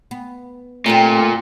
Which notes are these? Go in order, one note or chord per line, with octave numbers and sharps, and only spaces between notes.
B3
A#2 A3 C4 D4 G4